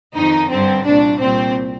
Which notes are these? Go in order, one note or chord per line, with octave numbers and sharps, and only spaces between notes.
F2 D#3 D#4
G2 D3 C4
C2 A#2 D4
C2 A#2 C4